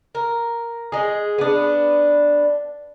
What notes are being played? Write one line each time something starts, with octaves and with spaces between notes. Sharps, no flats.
A#4
G#3 G#4
B3 D4